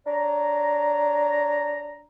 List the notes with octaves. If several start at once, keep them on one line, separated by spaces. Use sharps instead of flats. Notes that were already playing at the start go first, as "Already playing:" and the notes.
D4 C#5 A#5